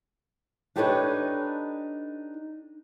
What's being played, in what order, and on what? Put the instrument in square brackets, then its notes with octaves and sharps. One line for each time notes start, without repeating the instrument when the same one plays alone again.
[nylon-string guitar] D4 D#4 G4 A4 B4 C#5